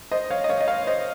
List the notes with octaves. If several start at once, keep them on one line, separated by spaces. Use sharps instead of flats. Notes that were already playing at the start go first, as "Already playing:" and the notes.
C5 D#5
C#5 F5
D#5
C#5 F5
D#5
C#5 F5
C5 D#5